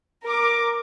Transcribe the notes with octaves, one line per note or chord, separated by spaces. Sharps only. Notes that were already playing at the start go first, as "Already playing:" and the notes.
A#4 D6